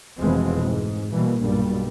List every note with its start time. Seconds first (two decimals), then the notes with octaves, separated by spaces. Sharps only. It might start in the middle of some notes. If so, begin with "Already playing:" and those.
0.20 F1 B2 E3 F3 G#3 C4
0.61 G#2
1.12 B2 E3 G3 A#3
1.41 B1 G2 A#2 G3